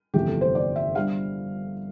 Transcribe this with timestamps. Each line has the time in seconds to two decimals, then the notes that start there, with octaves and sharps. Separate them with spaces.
0.14 G1 F2 C3 E3 A3 G4
0.28 A4
0.41 C5
0.55 D5
0.76 E5
0.95 D3 G3 F5